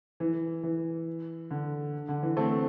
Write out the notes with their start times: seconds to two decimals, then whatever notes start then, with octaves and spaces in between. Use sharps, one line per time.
0.20 E3
0.63 E3
1.51 D3
2.09 D3
2.22 E3
2.37 A3 C4